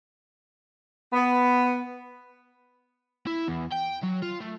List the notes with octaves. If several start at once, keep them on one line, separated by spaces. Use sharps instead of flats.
B3
E4
E2
G5
F#3
F4
A3